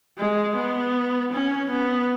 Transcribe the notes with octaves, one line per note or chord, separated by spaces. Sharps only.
G#3
B3
C#4
B3